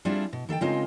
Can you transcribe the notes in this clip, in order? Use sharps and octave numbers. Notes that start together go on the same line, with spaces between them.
G3 C4 D4 E4 F4 G#4
B2
D#3 A4 F5 G5
C#3 G#3 C4 D#4 F4 A#4